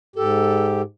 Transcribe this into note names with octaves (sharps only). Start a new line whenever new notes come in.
G#2 G4 A4